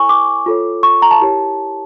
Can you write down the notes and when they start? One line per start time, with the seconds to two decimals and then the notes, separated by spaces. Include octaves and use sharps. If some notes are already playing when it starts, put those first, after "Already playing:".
Already playing: E4 A4 C#5 G#5 C#6
0.09 D6
0.46 F4 A4 C#5
0.83 C#6
1.02 A#5
1.11 A5
1.20 E4 G4 A#4 C#5